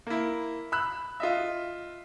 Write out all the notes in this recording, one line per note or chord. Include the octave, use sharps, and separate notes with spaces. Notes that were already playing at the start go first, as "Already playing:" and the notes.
A#3 E4
B5 E6 F#6
F4 D#5 E5